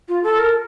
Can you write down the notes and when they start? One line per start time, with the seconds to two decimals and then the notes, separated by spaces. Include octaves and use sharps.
0.08 F4
0.23 A4
0.39 A#4